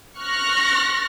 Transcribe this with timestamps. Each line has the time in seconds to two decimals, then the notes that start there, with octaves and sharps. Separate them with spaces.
0.19 C#6 F6 F#6 A#6